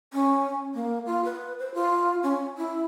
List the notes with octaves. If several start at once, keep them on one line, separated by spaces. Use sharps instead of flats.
C#4
A#3
F4
B4
C5
F4
C#4
E4